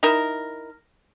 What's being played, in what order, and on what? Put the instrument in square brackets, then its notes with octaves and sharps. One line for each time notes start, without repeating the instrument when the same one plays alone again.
[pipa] D#4 E4 A#4